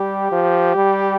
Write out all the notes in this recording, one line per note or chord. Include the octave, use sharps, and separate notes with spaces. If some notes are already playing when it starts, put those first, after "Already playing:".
Already playing: G3 G4
F3
G3